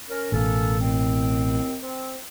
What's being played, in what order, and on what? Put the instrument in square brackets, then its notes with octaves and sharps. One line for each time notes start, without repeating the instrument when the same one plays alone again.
[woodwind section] C#4 A#4
[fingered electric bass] A1 B2 [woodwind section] A#3 C#4 A4
[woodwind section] D#2 A2 C4
C4